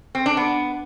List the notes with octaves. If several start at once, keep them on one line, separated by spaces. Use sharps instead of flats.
C4
D4
B3